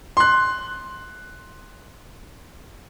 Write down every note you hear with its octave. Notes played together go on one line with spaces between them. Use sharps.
C6 F#6